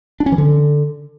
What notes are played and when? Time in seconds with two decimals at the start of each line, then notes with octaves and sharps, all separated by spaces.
0.20 D4
0.26 C#4
0.32 E3
0.38 D3